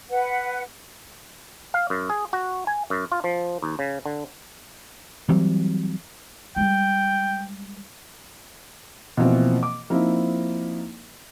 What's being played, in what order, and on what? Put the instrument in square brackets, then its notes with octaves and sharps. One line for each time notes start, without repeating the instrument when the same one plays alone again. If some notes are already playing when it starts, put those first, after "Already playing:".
[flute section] B4 F#5
[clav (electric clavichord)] F5
F#2
G#4
F#4
G#5
F#2
F4
F3
D#2
C#3
D3
[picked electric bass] E3 F#3 G3 C4
[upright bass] G3 G#3 [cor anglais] G5
[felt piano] B2 E3 F3 A#3 C4
D6
F3 A#3 C4 D#4 E4